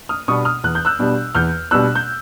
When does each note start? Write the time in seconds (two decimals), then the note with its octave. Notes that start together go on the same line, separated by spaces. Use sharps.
0.09 D#6 F6
0.28 B2 G3 B3 D4 C#6 D#6
0.45 D#6 F6
0.64 E2 F#6
0.75 G6
0.85 E6 F#6
0.99 B2 G3 B3 D4
1.35 E2 F6 G6
1.71 B2 G3 B3 D4 E6 F#6
1.95 G6